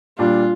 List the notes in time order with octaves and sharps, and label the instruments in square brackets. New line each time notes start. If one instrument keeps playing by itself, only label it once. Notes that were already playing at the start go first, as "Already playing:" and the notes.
[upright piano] A#2 G3 D4 [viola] F4